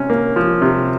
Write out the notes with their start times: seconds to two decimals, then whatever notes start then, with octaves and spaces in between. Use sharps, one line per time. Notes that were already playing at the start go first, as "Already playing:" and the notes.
Already playing: C3 C#4
0.10 A#3
0.36 F3
0.62 C3